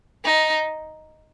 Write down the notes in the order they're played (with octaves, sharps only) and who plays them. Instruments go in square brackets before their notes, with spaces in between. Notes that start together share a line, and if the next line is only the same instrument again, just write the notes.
[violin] D#4